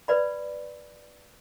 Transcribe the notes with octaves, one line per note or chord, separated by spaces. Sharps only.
B4 D5 B5